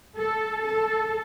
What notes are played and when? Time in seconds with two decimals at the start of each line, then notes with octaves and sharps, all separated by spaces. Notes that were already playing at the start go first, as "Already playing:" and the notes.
0.16 A4
0.63 A4